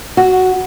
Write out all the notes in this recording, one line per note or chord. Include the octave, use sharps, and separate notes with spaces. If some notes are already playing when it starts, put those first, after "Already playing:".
F#4